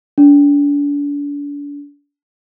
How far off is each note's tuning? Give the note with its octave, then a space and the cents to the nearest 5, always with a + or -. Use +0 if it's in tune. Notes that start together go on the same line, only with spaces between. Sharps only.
D4 -40